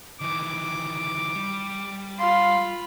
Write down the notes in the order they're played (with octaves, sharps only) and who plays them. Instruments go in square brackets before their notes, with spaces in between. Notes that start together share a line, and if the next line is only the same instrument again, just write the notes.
[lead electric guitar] D#3 E3 [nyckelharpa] D6
[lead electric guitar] G3
[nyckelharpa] F4 B5 [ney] F5 [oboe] C6